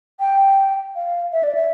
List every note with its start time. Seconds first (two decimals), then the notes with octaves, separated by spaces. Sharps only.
0.20 G5
0.95 F5
1.32 E5
1.43 D5
1.55 E5